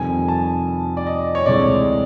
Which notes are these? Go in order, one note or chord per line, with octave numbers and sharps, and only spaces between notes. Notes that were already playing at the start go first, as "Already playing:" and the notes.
Already playing: F2 C3 D#3 G3 G#5
A5
D5
D#5
C#5
D2 C3 E3 G#3 D5